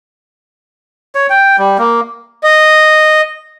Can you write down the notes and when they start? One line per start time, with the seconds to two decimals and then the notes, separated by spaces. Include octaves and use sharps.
1.15 C#5
1.30 G5
1.58 G3
1.78 A#3
2.44 D#5